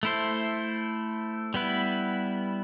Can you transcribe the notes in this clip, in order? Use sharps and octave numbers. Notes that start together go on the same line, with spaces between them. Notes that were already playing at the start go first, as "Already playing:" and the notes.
A3 E4 A4 C5
G3 B3 E4 B4